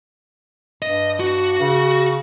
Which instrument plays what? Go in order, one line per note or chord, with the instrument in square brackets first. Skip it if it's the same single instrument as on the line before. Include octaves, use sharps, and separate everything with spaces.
[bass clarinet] G2 [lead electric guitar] D#5
[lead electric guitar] F#4
[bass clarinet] C#3